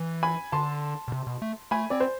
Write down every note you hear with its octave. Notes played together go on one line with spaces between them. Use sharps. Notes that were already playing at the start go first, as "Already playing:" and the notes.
Already playing: E3
G#5 B5
D3 A5 C6
B2
C3
B2
A3
A3 G#5 B5
C4 D5
C5